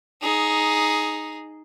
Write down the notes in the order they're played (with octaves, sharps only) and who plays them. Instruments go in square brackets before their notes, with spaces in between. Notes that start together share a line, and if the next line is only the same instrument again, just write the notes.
[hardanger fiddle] D#4 G#4